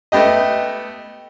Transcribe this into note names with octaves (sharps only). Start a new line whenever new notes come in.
A3 B3 G4 D#5